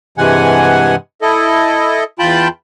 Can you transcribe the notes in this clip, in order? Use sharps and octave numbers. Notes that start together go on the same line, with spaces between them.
G2 C3 E3 G#3 F#5 G#5
E4 A4 D#5
E2 F4 G5 A5 B5